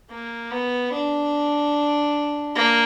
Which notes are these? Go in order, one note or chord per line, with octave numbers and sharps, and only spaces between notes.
A#3
B3
D4
A#3